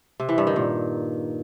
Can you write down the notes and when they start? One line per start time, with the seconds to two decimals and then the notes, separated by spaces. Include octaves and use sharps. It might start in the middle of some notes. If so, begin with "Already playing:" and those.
0.20 C3
0.29 E3
0.38 G2
0.47 D#3
0.56 A#2